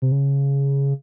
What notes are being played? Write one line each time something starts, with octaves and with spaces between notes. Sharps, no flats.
C3
C#3